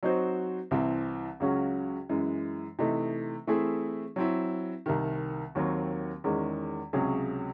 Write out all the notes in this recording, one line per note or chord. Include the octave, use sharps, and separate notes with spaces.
F#3 C4 D#4 F#4 C5
C2 C3 E3 C4
C#2 C#3 F#3 C#4 F#4
F#2 E3 G#3
C3 E3 A3 D#4
E3 A3 C4 E4 G#4
F#3 C4 E4
C2 C3 D#3
D#2 D#3 F#3 C4
E2 D#3 G#3 C#4
C#2 C3 F#3 C#4 G#4